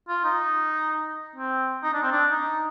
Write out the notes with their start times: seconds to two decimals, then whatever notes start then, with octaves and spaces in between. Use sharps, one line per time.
0.09 F4
0.25 D#4
1.36 C4
1.83 D#4
1.93 D4
2.02 C4
2.12 D4
2.31 D#4